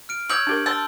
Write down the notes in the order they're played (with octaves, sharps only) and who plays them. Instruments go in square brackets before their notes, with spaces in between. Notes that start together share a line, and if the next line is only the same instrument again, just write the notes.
[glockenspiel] F6 D7
[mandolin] C#5 E6 [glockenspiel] G6 F#7
[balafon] D4 G4 A#4
[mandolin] A5 [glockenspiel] C6 E6